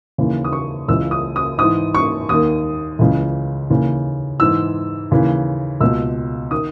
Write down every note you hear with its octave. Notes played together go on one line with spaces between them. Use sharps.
D#2 C#3 E3
D#6
C#6
C#2 C#3 E3 E6
D#6
D#6
G#2 E3 D#6
C#6
D#2 D#3 D#6
C#2 C#3 E3
D#2 C#3 E3
G#2 E3 E6
D#2 C#3 E3
C#2 B2 E6
D#3 D#6